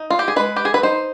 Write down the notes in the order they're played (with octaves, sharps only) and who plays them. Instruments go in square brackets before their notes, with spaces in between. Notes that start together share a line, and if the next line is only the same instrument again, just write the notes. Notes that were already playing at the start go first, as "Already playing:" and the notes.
Already playing: [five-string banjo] D#4
F4
G4
G#4
G#3 B4
G4
G#4
B4
D#4 C5